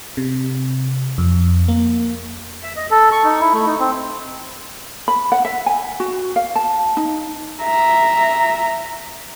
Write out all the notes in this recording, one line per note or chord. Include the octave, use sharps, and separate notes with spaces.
C3
F2
A#3
E5
D#5
A4
C#6
D#4
E4
A3
D#4
C4
B5
F#5
E5
G#5
F#4
F5
A5
D#4
E5 A#5